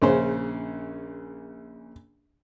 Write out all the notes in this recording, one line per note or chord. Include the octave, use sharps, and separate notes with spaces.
A#1 C#3 C#4 C5